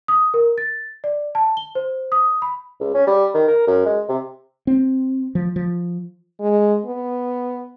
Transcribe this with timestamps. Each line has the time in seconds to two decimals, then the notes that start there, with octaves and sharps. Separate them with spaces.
0.08 D#6
0.34 A#4
0.58 A6
1.04 D5
1.35 A5
1.57 G7
1.75 C5
2.12 D#6
2.42 B5
2.80 C#2
2.95 C#4
3.07 G3
3.34 D#3
3.48 A#4
3.67 F#2
3.86 G#3
4.09 C3
4.67 C4
5.35 F3
5.56 F3
6.41 G#3
6.86 B3